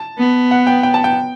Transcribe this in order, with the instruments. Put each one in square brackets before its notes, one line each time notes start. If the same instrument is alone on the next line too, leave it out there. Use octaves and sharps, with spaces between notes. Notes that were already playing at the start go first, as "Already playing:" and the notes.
Already playing: [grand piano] A5
[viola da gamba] B3
[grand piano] F#5
G5
G5
A5
G5